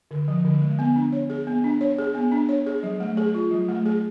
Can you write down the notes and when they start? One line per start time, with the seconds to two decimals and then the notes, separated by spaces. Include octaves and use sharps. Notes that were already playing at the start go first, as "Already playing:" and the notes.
0.11 D3
0.28 F3
0.45 D3
0.62 G#3
0.79 B3
0.96 D4
1.12 C#5
1.30 G#4
1.47 B3
1.64 D4
1.81 C#5
1.98 G#4
2.15 B3
2.32 D4
2.49 C#5
2.66 G#4
2.83 F#3
3.00 A3
3.17 G#4
3.34 F4
3.51 F#3
3.69 A3
3.86 G#4